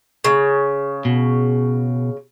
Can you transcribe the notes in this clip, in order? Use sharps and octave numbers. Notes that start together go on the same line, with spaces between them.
C#3
B2